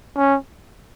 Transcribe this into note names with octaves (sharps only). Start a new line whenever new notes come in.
C#4